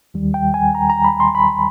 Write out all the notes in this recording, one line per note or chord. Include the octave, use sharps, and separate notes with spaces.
D#2 D#3 G3
G5
G#5
A#5
A#5
B5
C6
B5